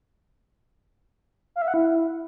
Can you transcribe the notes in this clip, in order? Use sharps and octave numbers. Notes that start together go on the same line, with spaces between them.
F5
E5
F#5
E4